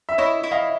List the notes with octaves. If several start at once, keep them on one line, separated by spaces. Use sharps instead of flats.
E5
E4 C#5 D#5
E4
D#5 F5